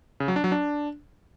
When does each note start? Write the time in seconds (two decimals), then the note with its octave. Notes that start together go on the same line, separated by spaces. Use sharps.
0.20 C#3
0.28 F#3
0.36 D4
0.44 F#3
0.52 D4